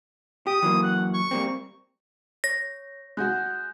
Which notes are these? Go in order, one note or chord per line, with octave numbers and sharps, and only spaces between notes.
G4 D#6
E3 F#3 A#3
F#5
C#6
G3 A#3 C4
C#5 A#6
G#3 F#4 F#6 G6